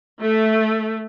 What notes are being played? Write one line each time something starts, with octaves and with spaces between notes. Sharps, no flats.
A3